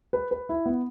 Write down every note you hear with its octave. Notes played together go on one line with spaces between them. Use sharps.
B4
B4
E4
B3